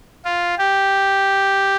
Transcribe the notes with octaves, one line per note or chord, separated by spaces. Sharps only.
F4
G4